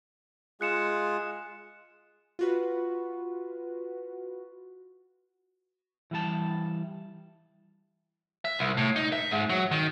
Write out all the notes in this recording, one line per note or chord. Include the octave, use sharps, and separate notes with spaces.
G#3 F4 G#4 F#6 C#7 E7
F4 F#4 B4
E3 G3 A5
E5
C2
A2
D#4
E5
G#2
F#3
D#3